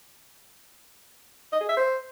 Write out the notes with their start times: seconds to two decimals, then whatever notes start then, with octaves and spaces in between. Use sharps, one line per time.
1.52 D#5
1.61 G#4
1.69 E5
1.77 C5